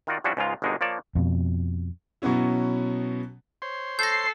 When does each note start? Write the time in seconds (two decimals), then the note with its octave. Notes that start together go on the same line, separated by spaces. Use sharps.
0.07 D#3 F4 F#4 D5
0.24 F3 G3 C#4 D4 E4 F#4
0.37 C#2 G#2 C#3 G#3 F4 F5
0.62 G1 B2 G#3 A#3 D4 D#4
0.81 F3 A#3 C#5 D5 A5
1.15 F2 B2
2.22 B2 F#3 B3 C#4 E4
3.62 C5 C#5 C6
3.99 A4 G6 A#6 C7